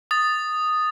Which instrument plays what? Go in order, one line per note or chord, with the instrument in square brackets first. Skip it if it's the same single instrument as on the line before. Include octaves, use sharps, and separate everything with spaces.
[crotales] D#6 A6